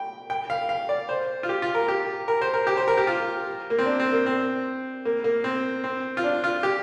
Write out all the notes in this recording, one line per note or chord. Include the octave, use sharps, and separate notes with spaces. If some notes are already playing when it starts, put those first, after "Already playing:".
Already playing: G5
G5
F5
F5
D5
C5
F4
G4
F4
A#4
G4
A#4
C5
A#4
G4
C5
A#4
G4
F4
A#3
C4
D4
C4
A#3
C4
A#3
A#3
C4
C4
F4
D4
F4
G4